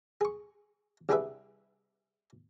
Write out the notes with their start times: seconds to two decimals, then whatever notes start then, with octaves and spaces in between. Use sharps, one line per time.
0.21 G#4 C#6
1.09 C2 G3 D4 G#4 B4 E5